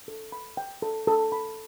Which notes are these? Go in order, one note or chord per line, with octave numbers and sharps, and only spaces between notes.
A4
B5
G5
A4
A4
B5